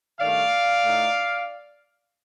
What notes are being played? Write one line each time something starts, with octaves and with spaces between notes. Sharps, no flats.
G2 D#3 A3 D5 F5
A2 A3 D#4